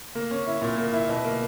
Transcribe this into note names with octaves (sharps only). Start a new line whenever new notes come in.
A#3
C#4
E4
A#2
A#3
E4
B2
A#3